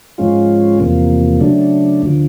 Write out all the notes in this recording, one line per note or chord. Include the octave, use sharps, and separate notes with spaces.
G#2 F3 G#3 C#4 F4
E2 C3 F3 A#3
C#3 F#3 A3 D4
D2 D3 F3